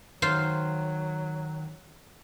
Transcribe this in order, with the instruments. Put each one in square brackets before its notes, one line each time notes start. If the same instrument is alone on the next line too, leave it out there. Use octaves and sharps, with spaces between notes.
[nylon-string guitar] D#3 [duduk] F#3 [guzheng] F4 C5 F5